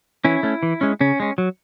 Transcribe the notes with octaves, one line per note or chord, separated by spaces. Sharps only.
E3 C#4 E4
A3 C#4
E3
G#3 C#4
C#3 C#4
G#3 C#4
F#3